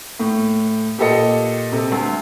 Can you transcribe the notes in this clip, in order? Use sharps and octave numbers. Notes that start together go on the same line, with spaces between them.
A2
A#2 G4 A4 D#5 C#7
C3 A4
D2